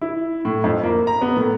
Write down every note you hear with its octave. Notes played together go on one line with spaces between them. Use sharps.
E4
A2
F2
A#3
A#5
B3
A2